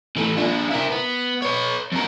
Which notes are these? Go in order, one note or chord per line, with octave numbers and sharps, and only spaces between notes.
E3 A3
D4 F4
E4 A#4
B3
B4 C#5
F2 A#4